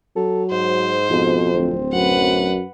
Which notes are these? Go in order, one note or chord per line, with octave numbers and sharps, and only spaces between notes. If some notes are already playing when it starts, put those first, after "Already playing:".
F#3 A4
G#2 C5
F2 B2
D1 C4
F#2 B4 F#5